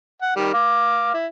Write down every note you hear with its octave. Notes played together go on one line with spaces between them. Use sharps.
F#5
D#3 G3
F5 D6
E4